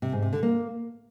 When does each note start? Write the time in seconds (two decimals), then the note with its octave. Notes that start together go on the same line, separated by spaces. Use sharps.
0.02 C3
0.12 G#2
0.22 C3
0.33 D3
0.43 A#3